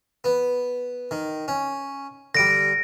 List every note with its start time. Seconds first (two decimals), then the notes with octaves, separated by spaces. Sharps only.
0.24 B3
1.11 D#3
1.48 C#4
2.35 D3 G3 A#6 D7